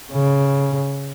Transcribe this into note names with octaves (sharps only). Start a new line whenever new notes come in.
C#3